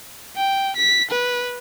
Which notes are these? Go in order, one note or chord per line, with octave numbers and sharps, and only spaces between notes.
G5
B6
B4